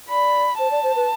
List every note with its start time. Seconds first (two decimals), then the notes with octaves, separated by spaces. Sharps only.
0.09 D5 B5
0.59 C5 A5
0.71 D5
0.83 C5
0.96 B4